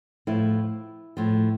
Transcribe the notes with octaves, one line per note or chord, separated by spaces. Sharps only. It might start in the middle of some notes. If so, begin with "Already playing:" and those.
A2 F3 E4
A2 F3